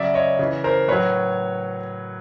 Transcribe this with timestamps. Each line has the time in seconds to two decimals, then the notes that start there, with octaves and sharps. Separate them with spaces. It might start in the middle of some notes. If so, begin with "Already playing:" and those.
Already playing: C#3 F#3 D5 E5
0.14 C#5 D#5
0.39 C#3 E3
0.64 A#4 C5
0.88 A2 F#3 B4 C#5